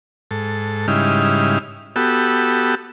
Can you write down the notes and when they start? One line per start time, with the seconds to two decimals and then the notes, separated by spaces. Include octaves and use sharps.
0.31 G#2 A4
0.88 G#2 C#3 G3 D#4 E4 F6
1.96 B3 F#4 G4 A4 E6